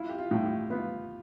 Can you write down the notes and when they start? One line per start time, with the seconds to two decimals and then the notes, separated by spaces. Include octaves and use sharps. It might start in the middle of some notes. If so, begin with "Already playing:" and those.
Already playing: E4 F4
0.09 G4
0.18 F4
0.31 A2
0.44 G4
0.70 B3 F4